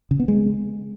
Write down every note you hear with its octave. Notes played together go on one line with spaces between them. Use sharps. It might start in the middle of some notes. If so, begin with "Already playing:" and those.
C#3
B3
G#3